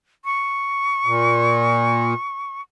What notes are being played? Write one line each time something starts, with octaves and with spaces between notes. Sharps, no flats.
C#6
A#2